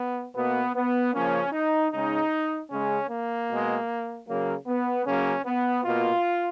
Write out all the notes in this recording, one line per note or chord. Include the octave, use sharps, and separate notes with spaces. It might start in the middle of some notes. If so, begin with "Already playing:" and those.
Already playing: B3
B2 A#3 B3
B3
C#3 F3 A#3 C#4
D#4
C#3 G#3 D#4
C#3 G#3 C#4
A#3
B2 G#3
C#3 F#3 A#3
B3
C#3 F#3 A#3 C#4
B3
B2 A#3 F4